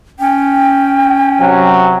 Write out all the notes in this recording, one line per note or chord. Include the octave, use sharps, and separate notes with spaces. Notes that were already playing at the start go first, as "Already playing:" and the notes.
C#4 G5
C3 F#3